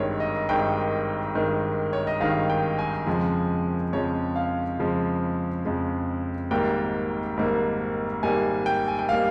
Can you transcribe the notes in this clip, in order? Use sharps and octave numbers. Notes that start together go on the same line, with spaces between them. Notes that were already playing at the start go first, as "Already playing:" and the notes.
Already playing: G#1 G2 D#3 G#3 C#5
D#5
G#1 G2 D#3 G#3 G5
G#1 G2 D#3 G#3
C#5
D#5
G#1 G2 D#3 G#3 F5
G5
G#5
F2 C#3 F3 G#3
F2 C#3 F3 G#3 C#5
F5
F2 C#3 F3 G#3
F2 C#3 F3 G#3
G#1 G#2 G3 A#3 G5
G#1 G#2 G3 A#3
G#1 G#2 G3 A#3 G#5
G5
G#5
G5
G3 A#3 F5